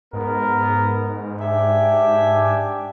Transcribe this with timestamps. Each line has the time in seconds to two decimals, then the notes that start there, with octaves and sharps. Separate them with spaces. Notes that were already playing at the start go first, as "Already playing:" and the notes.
0.13 G#2 B3 A#4
1.40 D4 G4 E5 G#5